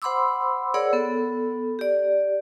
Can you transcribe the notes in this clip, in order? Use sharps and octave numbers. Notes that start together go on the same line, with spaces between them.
C5 F#5 B5 C6 D6 E6
G#4 A#4 C#5 D5 F#5 E6
B3 A4
G4 D5